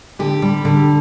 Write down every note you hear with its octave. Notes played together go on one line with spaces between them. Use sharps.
D3 G4
G3
D3